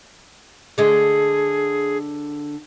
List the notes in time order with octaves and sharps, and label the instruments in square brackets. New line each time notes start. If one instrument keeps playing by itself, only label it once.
[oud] D3 G#3 [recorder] G#4